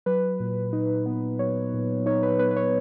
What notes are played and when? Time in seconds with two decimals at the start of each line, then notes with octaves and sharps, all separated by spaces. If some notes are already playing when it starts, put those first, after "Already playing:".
0.06 F#3 B4
0.40 A#2
0.73 D#4
1.06 B3
1.39 F#3 C#5
1.74 A#2
2.06 D#4 C#5
2.23 B4
2.39 B3 B4
2.51 B4
2.56 C#5